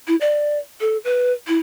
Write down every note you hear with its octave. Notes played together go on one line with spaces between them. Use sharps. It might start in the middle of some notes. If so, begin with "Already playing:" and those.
E4
D5
A4
B4
E4